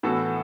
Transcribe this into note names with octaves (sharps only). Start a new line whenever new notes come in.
A2 E3 B3 F#4 A4